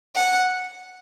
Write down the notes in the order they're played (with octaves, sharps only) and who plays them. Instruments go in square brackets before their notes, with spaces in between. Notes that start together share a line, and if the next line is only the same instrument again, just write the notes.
[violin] F#5